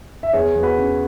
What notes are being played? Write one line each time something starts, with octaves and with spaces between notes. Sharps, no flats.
E5
E2 G#4 C#5
E2
F#4 B4
C#3